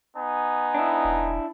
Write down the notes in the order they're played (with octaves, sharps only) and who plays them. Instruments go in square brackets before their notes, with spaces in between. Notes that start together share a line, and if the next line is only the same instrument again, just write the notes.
[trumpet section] B3 D#4 G#5
[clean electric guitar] D4 E4
[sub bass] E1